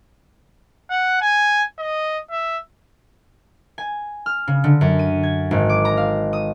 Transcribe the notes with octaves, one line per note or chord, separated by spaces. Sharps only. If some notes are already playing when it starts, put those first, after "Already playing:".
F#5
G#5
D#5
E5
G#5
F6
C#3
D3
F#2
D#7
G#6
G#1
D6
A#5
F5
D#6